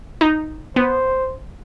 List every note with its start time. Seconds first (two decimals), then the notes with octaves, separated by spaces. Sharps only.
0.21 D#4
0.76 B3 C5